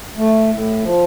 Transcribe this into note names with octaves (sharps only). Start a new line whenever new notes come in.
A3
A2
F3